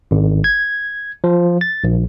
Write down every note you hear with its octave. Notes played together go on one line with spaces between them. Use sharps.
G#1
G#6
F3
A6
A#1